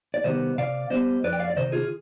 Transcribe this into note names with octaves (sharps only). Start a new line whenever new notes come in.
D5
C3 D#3 G3 B3 C5 D#5
C3 D5 F5
G3 B3 C5 D#5
F2 B4 D5
G5
D5 F5
D5
C3 D#3 C5 D#5
F4 G#4